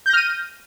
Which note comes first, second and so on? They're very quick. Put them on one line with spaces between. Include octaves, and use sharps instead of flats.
G6 A#6 F6 D#7